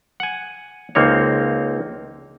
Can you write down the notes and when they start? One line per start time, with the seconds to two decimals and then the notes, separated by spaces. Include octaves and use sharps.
0.20 F#5 G#5
0.95 C#2 A#3 C4 D#4 C#5